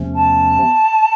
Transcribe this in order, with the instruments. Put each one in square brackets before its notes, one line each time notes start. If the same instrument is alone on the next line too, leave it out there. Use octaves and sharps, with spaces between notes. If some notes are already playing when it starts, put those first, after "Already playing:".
Already playing: [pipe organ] E2 C3 F3 A3 C#4
[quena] A5